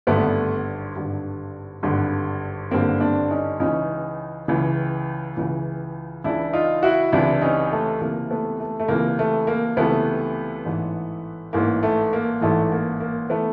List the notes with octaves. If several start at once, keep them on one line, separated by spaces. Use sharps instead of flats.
G#1 G2 D3 A3 B3
G#1 G2 D3
G#1 G2 D3
G#1 G2 D3 A#3 C4
C4 D4
C#4 D#4
C#2 C#3 E3 C#4 D#4
C#2 C#3 E3
C#2 C#3 E3
C#2 C#3 E3 D4 E4
D#4 F4
E4 F#4
C#2 C3 E3 D4 E4
C#4 D#4
A3
C#2 C3 E3 A#3
A3 B3
A3
A3
C#2 C3 E3 A#3
A3
A#3
C#2 C3 E3 A3 B3
A1 G#2 E3
A1 G#2 E3 A#3
A3
A#3
A1 G#2 E3 A3
A#3
A#3
E3 A3 B3